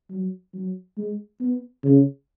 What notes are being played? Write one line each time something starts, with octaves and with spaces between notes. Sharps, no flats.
F#3
F#3
G#3
B3
C#3